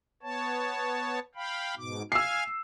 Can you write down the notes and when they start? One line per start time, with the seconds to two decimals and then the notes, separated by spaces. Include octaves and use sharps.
0.23 B3 C#5 A5
1.35 F5 G5 B5
1.77 G#2 B2 D6
2.12 F5 G#5 E6 F6 C7